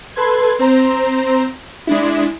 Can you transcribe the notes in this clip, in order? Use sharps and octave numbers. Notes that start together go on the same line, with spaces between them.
A4 B4 C6 G#6
C4 C5 A#5
G#3 D4 E4